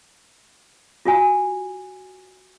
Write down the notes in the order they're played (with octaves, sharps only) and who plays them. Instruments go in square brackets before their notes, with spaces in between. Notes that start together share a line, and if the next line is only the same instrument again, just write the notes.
[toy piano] F4 F#4 G#5